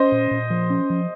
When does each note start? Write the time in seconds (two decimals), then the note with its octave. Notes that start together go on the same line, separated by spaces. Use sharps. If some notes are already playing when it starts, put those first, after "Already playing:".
Already playing: C#4 C5 D#5
0.12 A#2
0.31 A#2
0.50 F3
0.70 C#4
0.90 F3